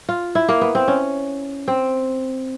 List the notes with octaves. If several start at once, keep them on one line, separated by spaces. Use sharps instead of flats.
F4
E4
A#3
B3
C4
C#4
C4